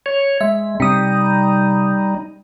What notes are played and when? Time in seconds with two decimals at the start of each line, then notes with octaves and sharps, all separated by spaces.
0.06 C#5
0.41 G#3 E5
0.80 C3 G3 D#4 D#6